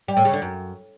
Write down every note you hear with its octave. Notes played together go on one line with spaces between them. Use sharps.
G3
A2
C#3
D3
F#2